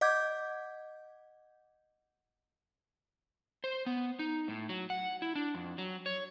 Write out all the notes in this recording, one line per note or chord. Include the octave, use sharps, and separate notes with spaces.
D#5 F#5 D6 G6 G#6
C5
B3
D#4
A2
F#3
F#5
E4
D4
F2
F#3
C#5